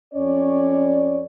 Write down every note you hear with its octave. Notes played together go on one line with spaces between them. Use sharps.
F2 C#4 C#5 D5